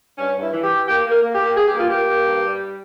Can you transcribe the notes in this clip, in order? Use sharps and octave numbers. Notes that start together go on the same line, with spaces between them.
G2 C#4
G2
E4
E3
G4
E3
A#3 G4
A#3
A#4
A#3
G4
A#3
G2 G#4
G4
A#3 F4
A#3 G4
A#3
G2
G3